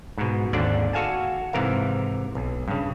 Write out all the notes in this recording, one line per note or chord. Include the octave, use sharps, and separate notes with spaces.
G#2 B2
G#1 D#2 G#2 D3 D4 D5
F#4 A4 F5 G#5 A5
G#2 C3 E3 A#4 F5
B1
G2 C#3